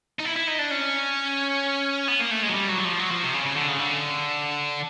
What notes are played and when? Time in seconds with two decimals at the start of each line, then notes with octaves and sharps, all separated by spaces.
0.19 D#4
0.25 E4
0.36 E4
0.47 D#4
0.59 D4
0.71 C#4
2.08 B3
2.20 A#3
2.31 A3
2.43 G#3
2.49 F#3
2.54 G3
2.69 F#3
2.79 F#3
2.85 F3
2.99 F#3
3.11 F3
3.23 C3
3.34 C#3
3.46 C#3
3.56 D3
3.68 C#3
3.79 D3